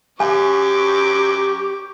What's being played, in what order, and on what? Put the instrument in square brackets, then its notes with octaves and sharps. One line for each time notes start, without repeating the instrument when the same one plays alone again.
[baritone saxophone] F#2 [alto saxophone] G4 [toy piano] G#5 [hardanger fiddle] C#6 D6